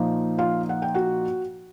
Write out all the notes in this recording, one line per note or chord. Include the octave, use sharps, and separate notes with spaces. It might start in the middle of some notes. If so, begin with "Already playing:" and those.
Already playing: A#2 F3 A#3 D#4
F4 F5
F#5
G5
F#4 F#5